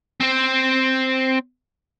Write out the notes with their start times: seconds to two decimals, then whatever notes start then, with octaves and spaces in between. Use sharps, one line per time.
0.20 C4 C5